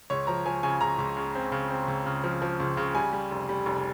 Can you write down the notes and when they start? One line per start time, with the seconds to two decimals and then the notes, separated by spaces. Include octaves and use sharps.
0.10 C#2 C#5
0.27 F3 A#5
0.46 F3 G#5
0.63 C#3 G#5
0.81 C#2 A#5
0.99 C#2
1.17 C#3
1.35 C4
1.52 C#3
1.70 C4
1.88 C#2
2.06 C#3
2.24 F3
2.42 F3
2.60 C#2
2.77 C#3
2.95 G3 G#5
3.12 G3
3.31 F1
3.49 G3
3.66 F1